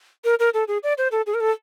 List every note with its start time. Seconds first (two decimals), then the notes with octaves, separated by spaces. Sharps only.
0.25 A#4
0.40 A#4
0.54 A4
0.68 G#4
0.83 D5
0.98 C5
1.12 A4
1.27 G#4
1.34 A#4
1.40 A4